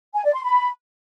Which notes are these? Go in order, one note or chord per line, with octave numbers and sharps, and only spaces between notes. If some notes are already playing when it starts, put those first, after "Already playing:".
G#5
D5
C6
B5